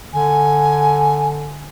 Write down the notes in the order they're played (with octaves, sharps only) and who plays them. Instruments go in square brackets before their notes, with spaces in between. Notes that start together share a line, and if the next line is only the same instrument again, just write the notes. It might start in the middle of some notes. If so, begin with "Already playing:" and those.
[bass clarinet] D3 [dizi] G#5